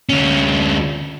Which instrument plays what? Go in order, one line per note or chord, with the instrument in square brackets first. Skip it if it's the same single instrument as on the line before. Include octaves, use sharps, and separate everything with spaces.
[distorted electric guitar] D2 C#4